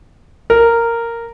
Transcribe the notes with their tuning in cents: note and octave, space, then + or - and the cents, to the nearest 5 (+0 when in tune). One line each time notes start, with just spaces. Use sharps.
A#4 -10